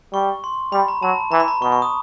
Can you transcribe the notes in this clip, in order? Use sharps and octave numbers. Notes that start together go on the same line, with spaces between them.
G3 C#6
C6
G3 B5
A#5
F#3 A5
E3 A#5
B5
A#5
B2 C#6
C#6
D#6